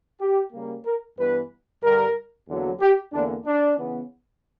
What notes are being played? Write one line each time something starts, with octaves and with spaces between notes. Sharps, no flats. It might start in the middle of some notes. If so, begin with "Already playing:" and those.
G4
C#3 G3 A#3
A#4
G2 E3 B3 B4
G2 D3 G3 A#4
E2 D3 F#3 A#3
G4
E2 D3 A#3 D4
D4
C#3 E3 B3